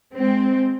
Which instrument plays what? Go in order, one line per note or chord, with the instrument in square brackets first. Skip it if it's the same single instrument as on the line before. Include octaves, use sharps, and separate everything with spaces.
[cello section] G#3 C4